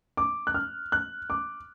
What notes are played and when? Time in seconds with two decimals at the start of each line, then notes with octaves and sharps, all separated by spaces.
0.17 D6
0.47 F#6
0.54 F6
0.92 F#6
1.30 D6